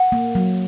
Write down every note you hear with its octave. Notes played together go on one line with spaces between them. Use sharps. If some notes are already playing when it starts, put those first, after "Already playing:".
Already playing: F#5
A#3
F#3